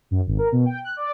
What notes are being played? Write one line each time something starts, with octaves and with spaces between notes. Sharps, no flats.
F#2
G#1
A#4
B2
G5
F#6
D5